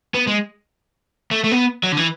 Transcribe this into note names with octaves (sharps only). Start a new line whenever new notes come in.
B3
G#3
A3
A3
B3
F#3
D3
E3